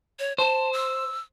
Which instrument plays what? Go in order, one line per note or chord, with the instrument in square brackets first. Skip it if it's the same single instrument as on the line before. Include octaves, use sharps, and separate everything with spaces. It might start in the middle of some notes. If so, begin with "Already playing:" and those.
[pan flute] C#5
[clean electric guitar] C5 [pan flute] A5
[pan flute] E6